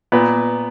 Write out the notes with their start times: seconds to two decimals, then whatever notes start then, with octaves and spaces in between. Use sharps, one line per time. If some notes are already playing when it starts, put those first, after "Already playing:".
0.12 A#2 B3